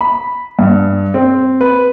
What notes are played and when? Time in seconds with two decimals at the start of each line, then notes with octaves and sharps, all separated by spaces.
0.01 B5
0.59 G2
1.14 C4
1.61 B4